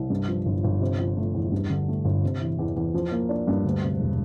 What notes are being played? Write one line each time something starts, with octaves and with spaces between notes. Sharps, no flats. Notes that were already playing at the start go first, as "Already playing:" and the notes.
Already playing: C2
G2
F3
G1
G1
C3
F3
A3
E2
G2
D3
A3
G1
C3
E3
E2
E2
F3
A#3
D4
G2
D2
C3
E1